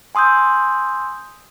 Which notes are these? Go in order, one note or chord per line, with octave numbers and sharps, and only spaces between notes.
G#5 C6 D#6 E6 G6